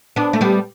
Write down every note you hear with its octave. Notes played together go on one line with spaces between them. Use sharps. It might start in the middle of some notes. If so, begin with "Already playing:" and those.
B3 D4
A3
G3 B3